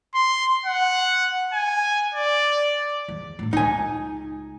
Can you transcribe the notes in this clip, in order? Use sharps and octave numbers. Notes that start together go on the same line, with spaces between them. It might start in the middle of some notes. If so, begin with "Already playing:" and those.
C6
F#5
G#5
D5
E2
A2 D3
C#2 D#4 G#5